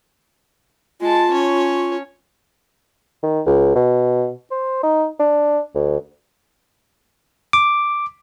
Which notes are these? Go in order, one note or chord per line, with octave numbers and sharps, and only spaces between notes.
G#3 F4 A5
C#4 C#5
D#3
C#2
B2
C5
D#4
D4
D2
D6